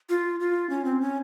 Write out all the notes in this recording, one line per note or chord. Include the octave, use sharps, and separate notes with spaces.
F4
F4
C#4
C4
C#4